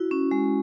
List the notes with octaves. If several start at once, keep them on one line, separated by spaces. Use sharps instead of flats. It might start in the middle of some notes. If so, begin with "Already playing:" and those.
Already playing: E4 F#4
C#4
G#3